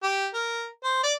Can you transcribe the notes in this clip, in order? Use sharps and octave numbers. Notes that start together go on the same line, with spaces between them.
G4
A#4
C5
D5